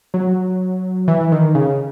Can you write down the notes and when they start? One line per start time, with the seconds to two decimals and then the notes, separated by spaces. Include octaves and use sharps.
0.14 F#3
1.08 E3
1.32 D#3
1.55 C#3